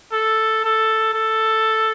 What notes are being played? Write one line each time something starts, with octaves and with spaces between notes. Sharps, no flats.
A4
A4
A4